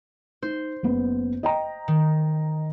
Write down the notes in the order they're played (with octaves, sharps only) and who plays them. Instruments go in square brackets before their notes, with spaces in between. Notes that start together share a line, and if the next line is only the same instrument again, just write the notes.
[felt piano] D#4 [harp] C5
[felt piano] F#1 B3
D#5 G5 A#5
[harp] D#3